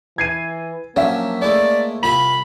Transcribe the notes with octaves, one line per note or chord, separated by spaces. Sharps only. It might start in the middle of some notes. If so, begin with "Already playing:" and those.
E3 G#6 C7 D#7
F3 F#3 A#3 C#4 D4 E5
G#3 A3 E4 D5
C2 F4 E5 B5 F#7